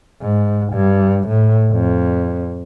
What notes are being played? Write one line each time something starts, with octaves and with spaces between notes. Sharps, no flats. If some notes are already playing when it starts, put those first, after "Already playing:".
G#2
G2
A2
F2